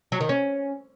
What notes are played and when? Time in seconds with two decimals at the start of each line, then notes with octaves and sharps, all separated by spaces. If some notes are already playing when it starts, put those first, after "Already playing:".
0.12 F#3
0.21 D#3
0.29 C#4